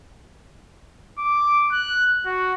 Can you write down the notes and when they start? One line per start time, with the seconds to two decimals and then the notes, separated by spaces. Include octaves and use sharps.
1.19 D6
1.72 F#6
2.26 F#4